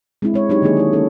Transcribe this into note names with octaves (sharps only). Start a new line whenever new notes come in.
G#3 C4 D4 E4
G#3 C#5
F#3 C4 D4 D#4 G4 C#5
D3 D#3 F#3 A#3 D4 G#4
E4 C#5
A#3 C#4 D#4 A4